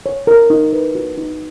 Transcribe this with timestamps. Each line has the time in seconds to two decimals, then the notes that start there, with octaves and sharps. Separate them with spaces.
0.06 C#5
0.27 A#4
0.50 D#4
0.73 B4
0.95 F#4
1.18 D#4